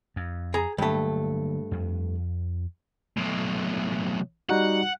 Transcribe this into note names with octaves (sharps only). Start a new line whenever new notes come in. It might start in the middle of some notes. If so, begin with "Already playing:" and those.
F2
G#4 A#5
G2 D3 F#3 A3 A#3
F2
B1 A2
G3 D#4 F#4 F#5